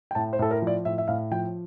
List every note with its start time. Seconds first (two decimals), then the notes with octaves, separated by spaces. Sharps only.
0.11 G5
0.15 A2 A5
0.33 C5
0.39 A2 A4
0.51 A#4
0.62 F3
0.67 D5
0.85 A2 E5
0.98 E5
1.08 A2 F5
1.31 F3 G5